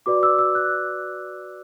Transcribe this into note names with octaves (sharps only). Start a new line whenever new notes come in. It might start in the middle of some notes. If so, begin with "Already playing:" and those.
F#4 B4 D5 D6
E6
E6
F#6